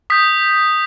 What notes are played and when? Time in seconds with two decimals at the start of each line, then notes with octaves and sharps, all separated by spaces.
0.10 D#6 G6 B6